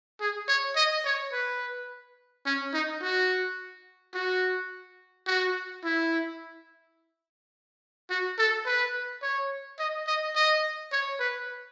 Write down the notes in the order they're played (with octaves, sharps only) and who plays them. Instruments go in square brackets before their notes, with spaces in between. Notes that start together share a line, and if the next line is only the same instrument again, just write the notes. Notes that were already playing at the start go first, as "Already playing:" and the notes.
[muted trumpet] G#4
C#5
D#5
C#5
B4
C#4
D#4
F#4
F#4
F#4
E4
F#4
A4
B4
C#5
D#5
D#5
D#5
C#5
B4